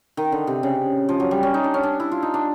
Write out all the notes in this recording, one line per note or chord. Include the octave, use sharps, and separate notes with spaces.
D#3
D3
C3
C#3
F3
F#3
G3
C#4
D#4
D4
C#4
D4
E4
F4
D#4
D4